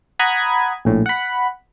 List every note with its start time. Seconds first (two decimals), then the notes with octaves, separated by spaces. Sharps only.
0.19 F#5 A#5 B5 D#6 G#6
0.85 A#1 A2
1.06 F#5 B5